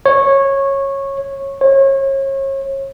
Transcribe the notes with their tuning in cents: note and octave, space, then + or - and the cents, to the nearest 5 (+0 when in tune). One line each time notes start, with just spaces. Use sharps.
C#5 -15
C#5 -35